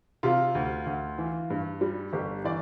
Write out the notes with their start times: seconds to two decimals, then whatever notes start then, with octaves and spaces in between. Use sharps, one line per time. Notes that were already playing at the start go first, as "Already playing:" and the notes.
0.23 C3 F4
0.55 D2
0.86 D2
1.18 E3
1.50 G2
1.81 G3
2.13 G1 G4
2.44 E3 D5